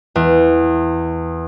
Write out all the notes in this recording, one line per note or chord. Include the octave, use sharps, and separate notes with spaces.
E2